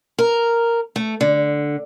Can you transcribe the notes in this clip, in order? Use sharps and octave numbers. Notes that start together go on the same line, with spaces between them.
A#4
A3
D3